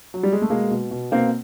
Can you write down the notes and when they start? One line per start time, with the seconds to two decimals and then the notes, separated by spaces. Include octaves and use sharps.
0.14 F#3
0.23 G3
0.33 G#3
0.42 A3
0.50 B2 G#3 A#3
0.71 B2
0.91 B2
1.11 B2 A#3 C4